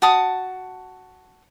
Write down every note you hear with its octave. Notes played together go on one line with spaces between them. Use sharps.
F#4 A5 D#6